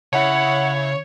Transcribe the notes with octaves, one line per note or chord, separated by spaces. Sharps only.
C#3 E4 C#5 F#5